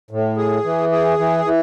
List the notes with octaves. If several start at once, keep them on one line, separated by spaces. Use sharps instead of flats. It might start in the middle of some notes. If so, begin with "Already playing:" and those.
A2
G#4
E3
G#4
E3
E3